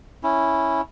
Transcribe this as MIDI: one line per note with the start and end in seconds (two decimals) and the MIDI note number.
0.23 0.81 61
0.23 0.81 64